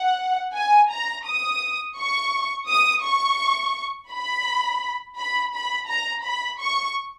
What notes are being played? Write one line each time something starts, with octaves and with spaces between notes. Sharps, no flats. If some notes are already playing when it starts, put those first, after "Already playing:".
Already playing: F#5
G#5
A#5
D#6
C#6
D#6
C#6
B5
B5
B5
A#5
B5
C#6